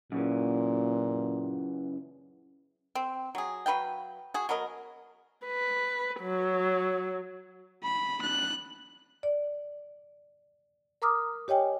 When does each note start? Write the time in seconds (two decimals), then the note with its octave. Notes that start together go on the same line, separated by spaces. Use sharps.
0.12 F#2 A#2 C#3 E3
2.95 C4
3.35 F#3 G#4
3.66 F#3 B4 F5 G5
4.34 F#4 G#4
4.49 F#3 B3 A#4 D#5
5.47 B4
6.21 F#3
7.84 B5
8.22 F#6
9.23 D5
11.02 A#4 A#5 D6 D#6 F6
11.48 G4 C#5 D#5 G5 G#5